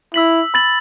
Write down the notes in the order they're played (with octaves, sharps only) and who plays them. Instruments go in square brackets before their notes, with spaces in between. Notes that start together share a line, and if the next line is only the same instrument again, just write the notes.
[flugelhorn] E4 [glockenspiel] E6 B6 F#7
[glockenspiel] B5 A6 F#7